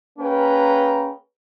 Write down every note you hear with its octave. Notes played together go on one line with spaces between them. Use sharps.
A#3 C#4 G#4 B4 G5 A#5